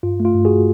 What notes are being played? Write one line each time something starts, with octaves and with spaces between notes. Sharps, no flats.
G2 F4
A3
F4
G2
F#4 G#4